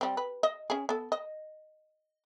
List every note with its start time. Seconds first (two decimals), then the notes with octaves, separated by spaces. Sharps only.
0.01 G3 C4
0.17 B4
0.43 D#5
0.70 C#4 G#4
0.89 B3 A4
1.12 D#5